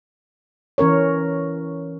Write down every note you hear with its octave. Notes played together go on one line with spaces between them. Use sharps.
E3 C#4 A#4 C#5